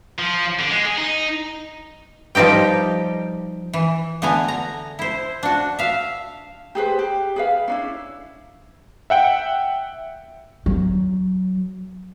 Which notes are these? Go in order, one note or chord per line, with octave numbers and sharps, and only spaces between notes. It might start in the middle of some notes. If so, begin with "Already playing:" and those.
F3
D3
G#3
G#4
D#4
F3 G3 D#4 G4 G5
E3
D3 A3 B3 G#5 A#5
A#5
E4 C5
D4 F#4
E5 F5
G4 G#4 B4 C5
G4
G#4 B4 F5
C#4 D4 E4
E5 F#5 G5
F#3